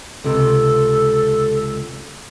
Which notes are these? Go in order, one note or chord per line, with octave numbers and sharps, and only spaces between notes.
C#2 C3 A4